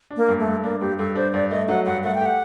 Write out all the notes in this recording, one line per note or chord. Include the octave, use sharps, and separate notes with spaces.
D4
A#3
G2
A3
G2
A#3 D4
G2 G4
G2 A4
D4 C5
G2 D5
A3 D#5
F#3 F#5
G2 F#5
A3 F#5
G5
G4 F#5